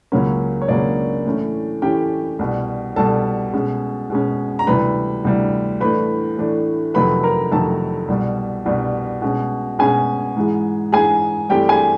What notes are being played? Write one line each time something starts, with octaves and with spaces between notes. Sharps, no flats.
C#2 C#3 F#3 A#3 C#4
C#5
C#2 C#3 F#3 A#3 C#4 D4 D5
A2 E3 A3 C#4
A2 E3 A3 C#4 G4 G5
C2 B2 G3
C2 B2 G3 A4 A5
B2 G#3 C#4
B2 G#3 C#4
A#5
D2 C3 E3 G3 B4 B5
D2 C3 E3 G3
A2 E3 A3 D4 B4 B5
A2 E3 A3 D4
F2 C3 D#3 F#3 A3 B4 B5
A#4 A#5
F2 C3 D#3 F#3 A3 A4 A5
C2 B2 G3
C2 B2 G3
B2 G#3 C#4
B2 G#3 C#4 G#4 G#5
G#2 E3 G#3
G#2 E3 G#3 G#4 G#5
G2 E3 A3 C4 G4 G5
G#4 G#5